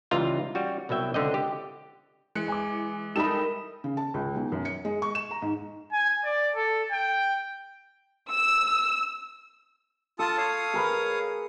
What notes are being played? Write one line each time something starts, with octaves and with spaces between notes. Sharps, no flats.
C#2 E3 G3 F4 D#5 A#5
G3 C#4 F#4
C2 B2 F#3 E5 G5
C#2 D3 C4 D#5
G4
E3 G#3 F#6 C#7
G#5 D6
G3 D#4 E4 A4 A#4 D#5 B5 E7
C#3
A5
C#2
B1
F#2
C#7
G#3
C#6
E7
A#5
G#2
G#5
D5
A4
G5
E6
F4 A4 A5 D#6
C#5 F5 D#6
G#4 A#4 B4